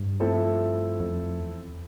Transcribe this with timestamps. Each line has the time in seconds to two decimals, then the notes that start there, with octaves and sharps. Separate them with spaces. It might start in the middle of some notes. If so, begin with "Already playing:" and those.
Already playing: G2
0.20 F3 A3 C4 E4 A4
1.00 F2
1.39 E2